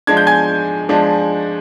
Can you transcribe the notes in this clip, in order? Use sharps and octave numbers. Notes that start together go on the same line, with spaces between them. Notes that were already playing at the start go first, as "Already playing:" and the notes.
F3 G#3 D4 G#6
G6
G#5 G#6
F3 G#3 D4